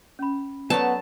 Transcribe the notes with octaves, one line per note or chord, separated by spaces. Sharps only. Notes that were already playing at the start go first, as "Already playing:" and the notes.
C#4 B5
F#3 A3 B3 A4 C#5 D5 A5